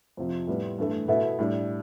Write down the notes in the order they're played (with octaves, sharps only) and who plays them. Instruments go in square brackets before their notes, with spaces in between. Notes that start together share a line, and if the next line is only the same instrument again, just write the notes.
[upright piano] F2 C3 F3
A2 G3 B3
G2 E3 A3
B2 B3 E4 A4 E5
A2 G3 D4